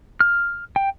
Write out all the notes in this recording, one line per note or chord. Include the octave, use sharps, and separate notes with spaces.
F6
G5